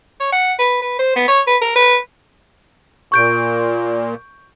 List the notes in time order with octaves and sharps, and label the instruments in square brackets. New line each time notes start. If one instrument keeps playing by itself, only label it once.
[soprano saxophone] C#5
F#5
B4
B4
C5
B3
C#5
B4
A#4
B4
[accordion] A#2 [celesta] C#6 G6 D7